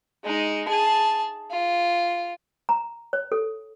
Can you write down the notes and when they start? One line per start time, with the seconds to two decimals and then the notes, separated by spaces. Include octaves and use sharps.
0.24 G#3 D#4
0.68 G#4 A5
1.50 F4
2.69 A#5
3.13 C#5
3.32 A4